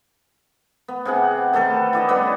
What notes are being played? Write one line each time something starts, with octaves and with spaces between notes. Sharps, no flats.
B3
C3 G#4 F#5
D#3 A3 A4 B4
E4 D5 D#5
C#3 G3 B3 B4